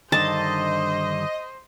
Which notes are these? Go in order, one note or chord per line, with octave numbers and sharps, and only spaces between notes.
G2 D3 D#3 C5 D#5 A5